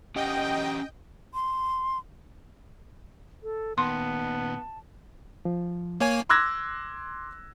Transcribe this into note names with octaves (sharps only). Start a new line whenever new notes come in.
C#4 G4 D#5 F#5 G5
C6
A4
A#2 D#3 B3 A5 C6
F3
A#3 C#5 G#5
C6 D6 E6 F#6 G#6 A#6